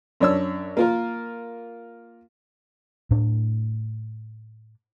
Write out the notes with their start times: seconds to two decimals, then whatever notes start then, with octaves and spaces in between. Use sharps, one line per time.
0.20 F#2 D4 C#5 E6
0.77 A#3 F4 A#4
3.11 A2 D4